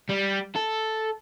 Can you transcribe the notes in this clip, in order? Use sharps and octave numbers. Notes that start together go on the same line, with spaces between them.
G3
A4